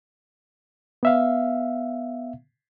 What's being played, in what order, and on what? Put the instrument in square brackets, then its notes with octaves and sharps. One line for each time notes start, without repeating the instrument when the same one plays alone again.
[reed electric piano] B3 E5 F5